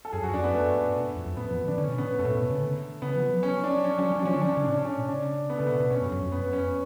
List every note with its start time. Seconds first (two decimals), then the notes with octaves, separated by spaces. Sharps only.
0.05 A4
0.12 F#2 G#4
0.23 F#2 F#4
0.33 F2 D4
0.43 F#2 B3
0.54 F2 A3
0.65 F#2
0.75 G#2
0.85 A2
0.96 B2
1.06 F#2
1.16 F2
1.26 F2
1.37 A2 B3
1.51 F3
1.65 D3 D4
1.78 D3 C#4
1.88 B2
1.98 A2 B3
2.19 F#2 A3
2.25 B2
2.29 A2
2.39 B2
2.50 C#3
2.61 D3
3.02 C#3 B3
3.16 F3
3.29 F#3
3.43 C#4
3.64 D4
3.84 F3 C#4
3.93 D4
3.98 F#3 C#4
4.12 F#3 C#4
4.19 D4
4.25 F3 C#4
4.34 D3 D4
4.41 C#4
4.48 D4
4.56 C#3 C#4
4.64 D4
4.67 A2 C#4
4.78 D4
4.85 C#4
4.96 B2
5.08 C#3 D4
5.50 B3
5.58 C#3 A3
5.67 B2 B3
5.80 B2
5.90 B2 C#4
6.01 F#2
6.12 F#2
6.21 F2
6.32 F#2 B3
6.53 F2 C#4